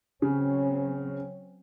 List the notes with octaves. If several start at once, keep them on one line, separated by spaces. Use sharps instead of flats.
C#3 F#3 C4 C#4